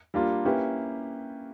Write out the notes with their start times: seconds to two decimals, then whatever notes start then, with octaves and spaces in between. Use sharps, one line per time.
0.14 G3 A#3 D4 F4
0.45 A#3 C#4 E4 G4 B4